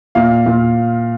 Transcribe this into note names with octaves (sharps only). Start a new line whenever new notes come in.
A#2 F5
A#2